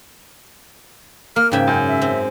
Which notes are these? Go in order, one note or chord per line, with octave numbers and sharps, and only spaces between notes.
A#3 F6
G#2 C#3 E5 G5
F#2
E5
C4